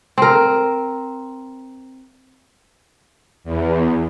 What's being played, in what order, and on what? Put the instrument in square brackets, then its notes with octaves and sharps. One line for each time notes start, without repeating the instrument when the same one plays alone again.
[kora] C4 A#4
[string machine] E2